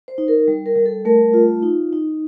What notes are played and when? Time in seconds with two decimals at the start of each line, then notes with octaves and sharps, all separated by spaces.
0.08 C5
0.18 D#4
0.28 A#4
0.48 G3
0.66 A#4
0.76 G3
0.86 A4
1.05 A3 A#4
1.33 F4
1.63 D#4
1.93 D#4